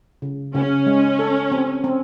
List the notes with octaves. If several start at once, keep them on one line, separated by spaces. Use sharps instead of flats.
C#3
C#3 C#4
G#3
A4
C4
C4